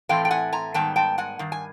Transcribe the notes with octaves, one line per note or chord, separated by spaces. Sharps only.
A2 E3 A3 C4 F5 G5
G5
F#5 G#5
G#5 A#5
G#2 D#3 G3 B3 G5 A5
G5 A5
F#5 G#5
G2 D#3
G#5